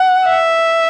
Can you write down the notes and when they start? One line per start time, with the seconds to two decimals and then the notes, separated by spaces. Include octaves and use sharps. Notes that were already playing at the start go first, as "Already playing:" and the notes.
Already playing: F#5
0.26 E5